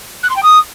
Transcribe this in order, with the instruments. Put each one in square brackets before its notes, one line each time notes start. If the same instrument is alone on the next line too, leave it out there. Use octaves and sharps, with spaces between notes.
[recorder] F#6
C6
G5
D#6